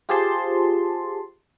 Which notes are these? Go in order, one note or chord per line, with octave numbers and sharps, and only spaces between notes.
F4 G4 G#4 C5 A5 C6